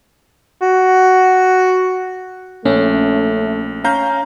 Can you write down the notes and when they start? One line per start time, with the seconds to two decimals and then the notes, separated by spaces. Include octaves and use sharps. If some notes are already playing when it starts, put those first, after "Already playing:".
0.62 F#4
2.65 A#1 A3 C#4
3.84 C#4 F5 A#5 G6